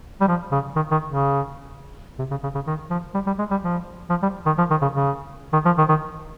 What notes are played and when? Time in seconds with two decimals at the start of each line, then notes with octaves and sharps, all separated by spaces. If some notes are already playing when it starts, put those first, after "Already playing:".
0.21 G3
0.28 F3
0.52 C#3
0.76 D#3
0.92 D#3
1.07 C#3
2.19 C3
2.31 C#3
2.43 C#3
2.55 C#3
2.67 D#3
2.90 F3
3.14 G3
3.27 G3
3.39 G#3
3.51 G3
3.63 F3
4.10 F3
4.22 G3
4.46 D#3
4.58 F3
4.70 D#3
4.82 C#3
4.93 C#3
5.53 D#3
5.65 F3
5.78 D#3
5.89 D#3